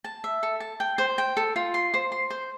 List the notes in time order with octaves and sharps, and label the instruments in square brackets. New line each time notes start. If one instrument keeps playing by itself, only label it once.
[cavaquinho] A5
E5
A4
A5
G5
C5
G5
A4
F4
C6
C5
C6
C5